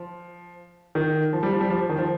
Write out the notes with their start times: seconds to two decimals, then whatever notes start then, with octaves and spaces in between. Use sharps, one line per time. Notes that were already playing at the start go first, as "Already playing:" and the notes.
Already playing: F3
0.95 D#3
1.33 F3
1.43 G3
1.52 F3
1.61 G3
1.70 F3
1.89 D#3
1.98 F3